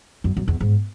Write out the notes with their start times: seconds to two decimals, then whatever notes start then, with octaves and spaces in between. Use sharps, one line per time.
0.24 F#2
0.37 F#2
0.48 E2
0.61 G#2